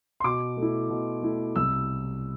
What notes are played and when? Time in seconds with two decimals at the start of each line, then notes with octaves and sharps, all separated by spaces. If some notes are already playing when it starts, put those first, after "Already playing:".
0.20 C6
0.24 B2 D6
0.57 A3
0.62 E4
0.90 B2
1.23 A3 E4
1.56 C2 E6